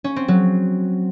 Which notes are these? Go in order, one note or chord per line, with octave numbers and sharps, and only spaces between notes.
C#4
C4
F#3